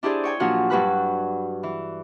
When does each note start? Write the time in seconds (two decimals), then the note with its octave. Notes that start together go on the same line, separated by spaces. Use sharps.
0.03 D4 E4 G4 G#4 C5 D5
0.24 C#5 G5 G#5
0.40 A#2 F3 F#3 D4 F#4
0.70 G2 F#3 G3 B4 B5 F#6
1.63 E3